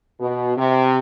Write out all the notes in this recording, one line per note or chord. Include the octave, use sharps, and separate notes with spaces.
B2
C3